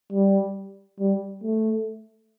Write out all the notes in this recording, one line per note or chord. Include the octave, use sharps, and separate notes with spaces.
G3
G3
A3